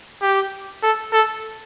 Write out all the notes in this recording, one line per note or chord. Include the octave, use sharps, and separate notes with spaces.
G4
A4
A4